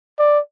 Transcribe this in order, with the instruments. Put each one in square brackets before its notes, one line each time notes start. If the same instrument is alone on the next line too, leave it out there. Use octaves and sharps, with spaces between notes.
[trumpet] D5